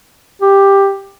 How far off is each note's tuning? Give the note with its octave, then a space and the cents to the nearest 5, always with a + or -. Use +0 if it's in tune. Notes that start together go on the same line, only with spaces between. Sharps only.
G4 +10